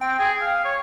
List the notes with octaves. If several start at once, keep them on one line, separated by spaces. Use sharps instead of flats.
C4 G5
G#4
F5
C#5